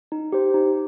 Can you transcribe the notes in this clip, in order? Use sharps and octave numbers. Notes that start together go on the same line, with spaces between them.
D#4
G4 C5
D#4